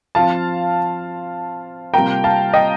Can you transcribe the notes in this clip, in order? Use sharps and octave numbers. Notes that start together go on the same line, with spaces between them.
F3 C4 F4 F5 A5
C3 G3 A#3 F4 G5 A#5
F5 A5
D#5 G5